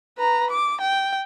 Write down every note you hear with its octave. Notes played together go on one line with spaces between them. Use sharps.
B4 A#5
D6
G5